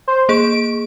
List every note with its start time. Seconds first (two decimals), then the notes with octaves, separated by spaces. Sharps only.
0.08 C5
0.29 A#3 G#4 D7